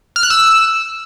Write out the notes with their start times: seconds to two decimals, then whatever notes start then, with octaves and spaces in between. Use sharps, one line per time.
0.16 F6
0.23 F#6
0.30 E6